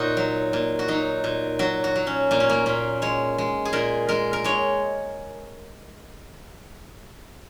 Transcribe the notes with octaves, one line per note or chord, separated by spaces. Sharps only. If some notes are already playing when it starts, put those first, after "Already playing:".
Already playing: A#2 D#4 F#4 C#5 D#5
F#3
A#2
F#4
F#3 D#4
A#2
F#3 F#4
F#4
F#3
C#4
A#2 A#3
C#4
A#3
A#2 C#4
G#3 C#5
G#3
G#4
A#2 A#4
G#3 A#4
A#4
G#3 C#5